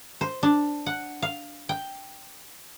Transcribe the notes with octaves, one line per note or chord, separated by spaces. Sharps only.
C5
D4
F#5
F5
G5